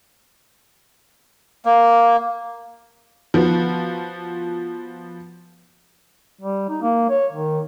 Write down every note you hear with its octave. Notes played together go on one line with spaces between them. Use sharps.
A#3
F3 B3 F#4
G3
D#4
A#3
C#5
D#3